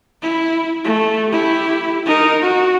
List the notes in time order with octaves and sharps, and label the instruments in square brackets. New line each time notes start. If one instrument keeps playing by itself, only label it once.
[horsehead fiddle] E4
A3
E4 G4
D#4 A#4
F#4